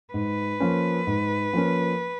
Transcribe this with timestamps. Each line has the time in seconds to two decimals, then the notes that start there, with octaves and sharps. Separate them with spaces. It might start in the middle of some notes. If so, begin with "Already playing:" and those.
0.13 G#2 B4
0.60 F3 A#3 C#4
1.07 G#2
1.53 F3 A#3 C#4